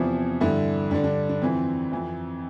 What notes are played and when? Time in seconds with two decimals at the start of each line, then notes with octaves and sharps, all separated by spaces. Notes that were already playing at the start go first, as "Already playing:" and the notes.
Already playing: E2 C3 E3 F3
0.40 G2 D3 E4
0.91 G2 D3 D4
1.04 D4
1.29 D4
1.41 F2 E3 C4
1.92 F2 E3